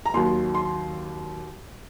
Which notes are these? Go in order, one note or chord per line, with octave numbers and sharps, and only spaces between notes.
A#5
D#2 D#3 F#3 C6
C6